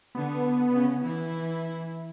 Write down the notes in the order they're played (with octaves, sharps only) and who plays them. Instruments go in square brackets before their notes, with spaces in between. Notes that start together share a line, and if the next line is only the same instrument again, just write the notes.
[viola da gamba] D3 [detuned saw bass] B3
[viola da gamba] C#3 C#4
E3 E4